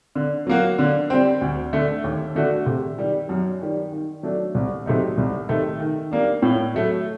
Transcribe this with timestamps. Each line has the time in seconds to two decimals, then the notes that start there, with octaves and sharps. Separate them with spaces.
0.15 D3
0.47 F#3 A#3 F#4
0.79 D3
1.10 G3 C4
1.41 D2
1.73 D3 A3
2.04 D#2
2.35 D3 A3 D4 F#4
2.66 C3
2.98 D#3 G3
3.29 F#2
3.61 D#3 G3
3.92 D#3
4.23 F#3 A3 D4
4.55 C2
4.86 C3 F#3 A3 D#4
5.17 C2
5.49 C3 D#3 A3 D#4
5.80 D#3
6.11 G3 A#3 D4
6.42 A2
6.75 F#3 A3